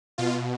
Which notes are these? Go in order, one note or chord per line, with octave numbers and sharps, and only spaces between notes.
B2 F4